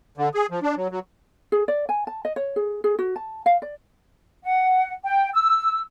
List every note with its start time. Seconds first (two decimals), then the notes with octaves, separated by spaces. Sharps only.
0.18 D3
0.34 G#4
0.51 F3
0.63 D4
0.77 F#3
0.91 F#3
1.52 G#4
1.68 D5
1.89 G#5
2.07 A5
2.25 D#5
2.36 C#5
2.56 G#4
2.84 G#4
2.99 F#4
3.16 A5
3.46 F5
3.62 D5
4.43 F#5
5.04 G5
5.33 E6